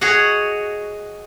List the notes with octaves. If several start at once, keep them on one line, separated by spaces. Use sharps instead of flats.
F#4 G#4 C#5 D#5 F#5